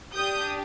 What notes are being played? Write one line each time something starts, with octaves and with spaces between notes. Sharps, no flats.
D4 G4 D#6 G6